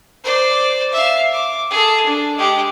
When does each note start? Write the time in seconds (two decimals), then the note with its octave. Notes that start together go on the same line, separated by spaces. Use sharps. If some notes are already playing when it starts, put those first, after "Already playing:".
0.24 C5 D5
0.92 E5 F5
1.33 D6
1.70 G#4 A4
2.06 D4
2.36 G#3 G4